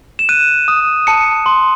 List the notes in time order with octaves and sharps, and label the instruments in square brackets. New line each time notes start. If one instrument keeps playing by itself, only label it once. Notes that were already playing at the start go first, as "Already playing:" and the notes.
[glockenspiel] E7
F#6 D#7
D#6
A5 C#7
C6